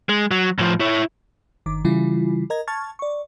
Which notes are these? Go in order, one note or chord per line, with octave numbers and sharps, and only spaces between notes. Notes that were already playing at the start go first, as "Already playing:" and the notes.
G#3
F#3
A2 F3
E4 C#5
G1 D#3 D6
C#3 E3 G3 E4 F4
A#4 D#5 A#5 G#6
A5 C#6 F6 G#6 A6
D5 C#6